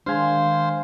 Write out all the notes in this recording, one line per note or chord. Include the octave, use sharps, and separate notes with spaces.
D#3 G#3 D4 C5 F5 G#5 C6